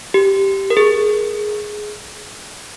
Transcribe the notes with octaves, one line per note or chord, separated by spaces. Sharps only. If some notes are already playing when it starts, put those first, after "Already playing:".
G4
A#4
G#4